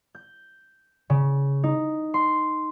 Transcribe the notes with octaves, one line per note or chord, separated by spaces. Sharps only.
G6
C#3
D#4
C6